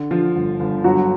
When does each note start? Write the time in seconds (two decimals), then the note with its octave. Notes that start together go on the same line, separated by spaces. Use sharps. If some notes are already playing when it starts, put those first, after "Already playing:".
Already playing: D3
0.11 D3 F3 F4
0.36 G1
0.60 G1
0.84 G1 F#3 F#4